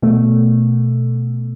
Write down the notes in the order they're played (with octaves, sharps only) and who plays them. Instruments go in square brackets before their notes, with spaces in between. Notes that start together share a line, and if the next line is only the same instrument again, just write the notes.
[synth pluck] B2 A3